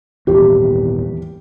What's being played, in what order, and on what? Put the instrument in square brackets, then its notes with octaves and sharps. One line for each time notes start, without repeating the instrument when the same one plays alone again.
[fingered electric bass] D#1 G#1 E2 [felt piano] G4